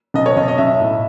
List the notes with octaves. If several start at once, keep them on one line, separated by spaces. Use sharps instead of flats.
B1 D#5
C#5
B1 D#5
D#5
B1 E5
A2